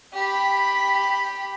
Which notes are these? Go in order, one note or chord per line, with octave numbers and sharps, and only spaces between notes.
G4 B5